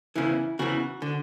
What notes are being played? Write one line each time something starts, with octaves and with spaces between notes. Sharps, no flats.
E2 C#3 E3 E4
E2 C#3 E3 F#4
D3